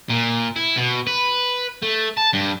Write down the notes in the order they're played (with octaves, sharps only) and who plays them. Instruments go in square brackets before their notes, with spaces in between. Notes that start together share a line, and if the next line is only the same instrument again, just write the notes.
[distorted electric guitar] A#2
E4
B2
B4
A3
A5
G2